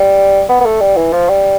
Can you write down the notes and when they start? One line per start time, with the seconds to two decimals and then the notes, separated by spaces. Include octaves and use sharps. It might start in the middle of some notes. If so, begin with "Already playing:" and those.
Already playing: G3
0.49 B3
0.60 B3
0.65 A3
0.81 G3
0.96 E3
1.13 F3
1.29 G3